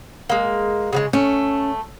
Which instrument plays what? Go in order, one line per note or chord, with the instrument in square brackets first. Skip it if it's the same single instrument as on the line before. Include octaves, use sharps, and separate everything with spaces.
[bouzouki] G#3 A#3
C#3 F#3 G#3
[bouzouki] A3 [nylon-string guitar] C#4